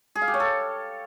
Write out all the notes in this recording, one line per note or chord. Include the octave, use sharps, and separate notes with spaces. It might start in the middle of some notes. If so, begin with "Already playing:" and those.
G#4
F5
G4
C#5
A4